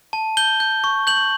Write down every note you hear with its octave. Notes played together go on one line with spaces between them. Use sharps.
A5
G6 G7
G6
C#6
G6 F#7